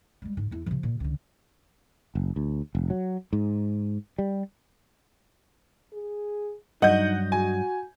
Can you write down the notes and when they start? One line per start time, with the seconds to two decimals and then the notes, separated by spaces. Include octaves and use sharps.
0.22 G3 G#3
0.37 G#2
0.51 E2 E4
0.66 C3 F3
0.83 A#2
1.00 C#2 D3
2.15 F#1
2.36 D2
2.75 F1
2.90 F#3
3.33 G#2
4.18 G3
5.93 G#4
6.82 G2 F#3 D#4 D#5 F#5 G6
7.32 F#4 G#5